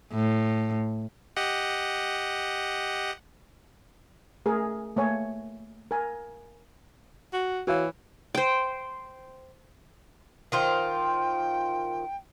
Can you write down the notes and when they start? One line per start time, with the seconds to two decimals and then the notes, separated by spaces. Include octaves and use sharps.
0.13 A2
1.36 G4 D#5 F#5
4.46 A3 G#4 A#4
4.97 A3 A#3 C#5 G#5
5.91 A#4 G#5
7.33 F#4
7.67 E3 F#4 C#5 F5
8.35 C5 G5
10.52 D#3 F4 C5 G5